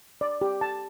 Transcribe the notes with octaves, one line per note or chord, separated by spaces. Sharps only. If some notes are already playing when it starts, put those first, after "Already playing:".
D5
G4
A5